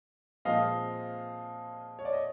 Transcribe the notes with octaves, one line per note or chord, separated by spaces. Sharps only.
A#2 F3 G#3 C4 D#5 F5
C#5
D5
D#5